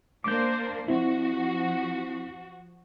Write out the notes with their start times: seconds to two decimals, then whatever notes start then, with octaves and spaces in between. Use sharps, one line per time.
0.24 A#3 D4 C5 D6 G6
0.88 F3 C4 E4 F#4